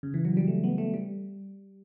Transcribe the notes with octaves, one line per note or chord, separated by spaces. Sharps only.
C#3
E3
F#3
G3
A3
B3
A3
G3